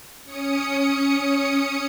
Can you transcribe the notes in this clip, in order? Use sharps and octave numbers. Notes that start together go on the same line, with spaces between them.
C#4 D#6 C#7